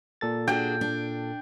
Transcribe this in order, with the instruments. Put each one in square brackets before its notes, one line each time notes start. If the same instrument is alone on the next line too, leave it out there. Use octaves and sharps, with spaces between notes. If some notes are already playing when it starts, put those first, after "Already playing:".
[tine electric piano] A#2 A4 A6
[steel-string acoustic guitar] D4 F#4 G#4 [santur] G5
[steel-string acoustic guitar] D4